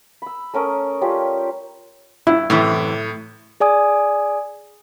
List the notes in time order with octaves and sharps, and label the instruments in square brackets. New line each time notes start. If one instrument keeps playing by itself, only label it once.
[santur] B5 E6
A3 C#4 A#4 D#6
G3 C#4 F4 G4
[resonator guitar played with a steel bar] G2 [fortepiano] E4
[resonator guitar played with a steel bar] F#2 C3 E3 [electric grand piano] A2
[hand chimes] G#4 D5 G#5 D#6